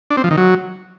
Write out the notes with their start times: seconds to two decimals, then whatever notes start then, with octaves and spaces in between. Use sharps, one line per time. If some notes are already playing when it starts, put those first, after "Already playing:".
0.10 D4
0.17 C4
0.24 F3
0.31 D#3
0.37 F#3